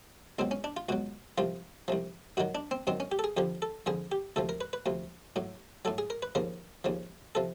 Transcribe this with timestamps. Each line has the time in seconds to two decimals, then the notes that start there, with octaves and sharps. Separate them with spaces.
0.39 C#2 B2 F#3 C4
0.51 C#4
0.64 D4
0.77 F4
0.89 C#2 B2 F#3 F#4
1.38 C2 C3 F3 F4
1.88 C2 C3 F3
2.37 F#2 D#3 F#3 F#4
2.55 D4
2.71 C4
2.87 F#2 D#3 F#3 C4
3.00 C#4
3.12 G4
3.19 A4
3.24 G#4
3.37 F2 D3 F3 G4
3.62 A4
3.86 F2 D3 F3 G#4
4.12 G4
4.36 D2 C3 F3 A4
4.49 A#4
4.61 B4
4.73 B4
4.86 D2 C3 F3
5.36 A2 F#3
5.85 A2 F#3 A4
5.98 G#4
6.10 A#4
6.22 B4
6.35 D#2 C#3 F3 A#4
6.84 D#2 C#3 F3
7.35 C3 F3 A4